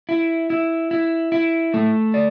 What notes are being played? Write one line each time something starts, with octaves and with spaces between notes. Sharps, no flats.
E4
E4
E4
E4
A3
D5